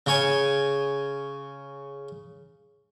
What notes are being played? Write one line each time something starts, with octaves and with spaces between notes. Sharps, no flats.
C#3 C#5 G#5